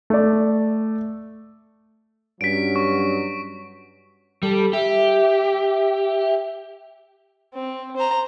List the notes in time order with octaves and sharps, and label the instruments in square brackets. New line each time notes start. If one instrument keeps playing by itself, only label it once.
[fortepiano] A3 D5
[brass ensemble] G2 F#3 C#4 [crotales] B6 D7
[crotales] C#6
[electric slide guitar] G3 [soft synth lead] A4
[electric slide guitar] G4 [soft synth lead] E5
[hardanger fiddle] C4
C5 A#5